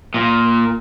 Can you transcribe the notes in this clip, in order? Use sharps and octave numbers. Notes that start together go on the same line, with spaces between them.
A#2